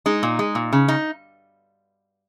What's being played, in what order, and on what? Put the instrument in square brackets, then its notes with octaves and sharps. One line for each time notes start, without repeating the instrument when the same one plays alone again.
[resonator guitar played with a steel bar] G#3 D#4
A#2
G#3
A#2
C#3
D#4